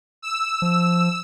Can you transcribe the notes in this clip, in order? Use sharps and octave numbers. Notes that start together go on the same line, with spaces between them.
E6
F3